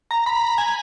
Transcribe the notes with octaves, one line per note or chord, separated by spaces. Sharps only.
A#5
B5
G#5